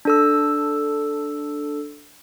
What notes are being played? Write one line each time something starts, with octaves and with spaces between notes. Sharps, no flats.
D4 A4 E6